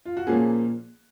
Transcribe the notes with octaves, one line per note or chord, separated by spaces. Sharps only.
F4
F#4
A#2 F3 A#3 C#4 G#4